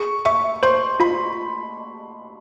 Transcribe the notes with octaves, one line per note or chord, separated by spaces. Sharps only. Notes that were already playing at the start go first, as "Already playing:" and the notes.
Already playing: G#4 C#6
E5 C#6
C5 C6
F4 B5